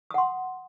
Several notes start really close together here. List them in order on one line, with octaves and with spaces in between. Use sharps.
D#6 F#5 C6